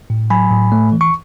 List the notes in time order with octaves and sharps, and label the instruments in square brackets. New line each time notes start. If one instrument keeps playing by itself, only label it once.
[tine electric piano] A2
F#3 G#5 B5
A2
A3
E3
C#6